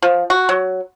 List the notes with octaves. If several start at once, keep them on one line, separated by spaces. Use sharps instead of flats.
F3
F#4
F#3